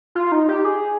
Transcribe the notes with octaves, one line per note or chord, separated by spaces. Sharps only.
F4
D#4
G4
G#4